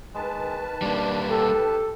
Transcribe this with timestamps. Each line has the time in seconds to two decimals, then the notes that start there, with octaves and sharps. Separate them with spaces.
0.15 D#3 G#3 B4 A5
0.82 G3 A#3 D4
1.31 G4 A4